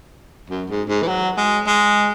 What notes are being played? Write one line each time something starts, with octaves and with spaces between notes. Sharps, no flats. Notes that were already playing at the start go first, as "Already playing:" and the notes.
F#2
G#2
G#2
E3
F#3
G#3
G#3